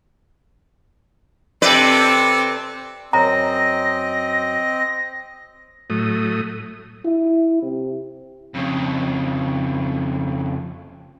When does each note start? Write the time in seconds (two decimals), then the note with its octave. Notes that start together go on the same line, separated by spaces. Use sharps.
1.62 C3 C4 A4 B4 D5
3.13 F#2 C4 D#5 A#5 A#6
5.90 A2 F#3 A3 D#6
7.05 E4
7.62 C3
8.54 F2 C#3